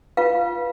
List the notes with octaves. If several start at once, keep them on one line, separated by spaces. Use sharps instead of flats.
F4 B4 F5